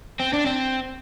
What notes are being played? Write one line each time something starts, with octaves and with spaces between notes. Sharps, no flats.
C4
D4
C4